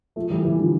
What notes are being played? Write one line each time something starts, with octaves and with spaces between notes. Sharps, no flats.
F3 A3
E3 G3
E3 G3
D3 F3